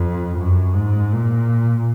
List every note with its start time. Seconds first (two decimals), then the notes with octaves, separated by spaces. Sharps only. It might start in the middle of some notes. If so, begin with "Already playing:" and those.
Already playing: F2
0.38 F#2
0.75 G#2
1.12 A#2